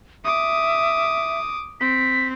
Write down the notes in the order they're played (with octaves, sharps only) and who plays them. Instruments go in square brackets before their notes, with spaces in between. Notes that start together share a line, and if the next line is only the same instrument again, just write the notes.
[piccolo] E5 [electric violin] D6 D#6
[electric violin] C4 [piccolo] B6